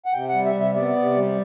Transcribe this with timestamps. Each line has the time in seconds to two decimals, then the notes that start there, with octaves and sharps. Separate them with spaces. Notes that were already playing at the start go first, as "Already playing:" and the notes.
0.06 F#5
0.13 C3 G5
0.29 F#5
0.34 G3
0.45 E5
0.55 C3 E5
0.76 B3 D5
0.96 C3
1.16 G3